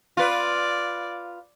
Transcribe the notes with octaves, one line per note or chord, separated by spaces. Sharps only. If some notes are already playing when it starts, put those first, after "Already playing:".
F4 B4 D5